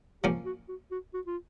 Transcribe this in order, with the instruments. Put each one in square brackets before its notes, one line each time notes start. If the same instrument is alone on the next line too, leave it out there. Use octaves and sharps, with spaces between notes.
[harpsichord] F3 A#3 C#4 [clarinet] G4
[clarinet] F#4
F#4
F#4
F#4
F4